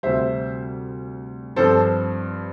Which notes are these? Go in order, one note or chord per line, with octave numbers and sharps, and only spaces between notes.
D2 C3 G3 C5 E5
G2 F3 C4 A4 C5